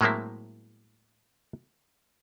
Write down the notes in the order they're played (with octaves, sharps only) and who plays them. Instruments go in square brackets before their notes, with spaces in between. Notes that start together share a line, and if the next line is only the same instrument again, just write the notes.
[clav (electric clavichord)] A2 F#3 G#3 A#3 C4 E4